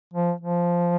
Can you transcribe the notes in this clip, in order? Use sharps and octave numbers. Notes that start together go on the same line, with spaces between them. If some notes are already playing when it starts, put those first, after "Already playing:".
F3
F3